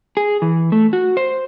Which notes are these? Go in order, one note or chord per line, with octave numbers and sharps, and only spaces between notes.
G#4
E3
A3
F#4
C5